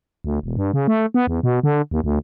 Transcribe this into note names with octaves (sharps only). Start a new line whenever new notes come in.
D2
E1
G2
C#3
A3
B3
E2
B2
D3
D#2
D2